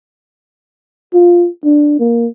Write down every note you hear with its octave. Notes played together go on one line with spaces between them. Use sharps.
F4
D4
A#3